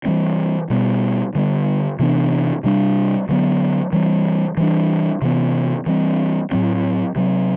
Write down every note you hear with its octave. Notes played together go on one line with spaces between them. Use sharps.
E3 G3 C4
B2 G3 B3
D3 G3 B3
C3 E3 B3 D4
C3 G3 D4
D3 F#3 B3
E3 G3 C4
E3 G3 D4
C3 E3 B3
E3 G3 C4
A2 F#3 C4
C3 F#3 C4